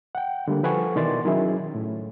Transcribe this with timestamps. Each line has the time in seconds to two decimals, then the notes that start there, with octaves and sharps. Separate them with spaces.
0.15 F#5 G5
0.48 D3 G3 A#3
0.63 F3 A4 B4 F#5 G#5 C#6
0.96 B2 D#3 E3 D5 C6 A6
1.25 D#3 F#3 C#4 E4 G#4
1.75 A2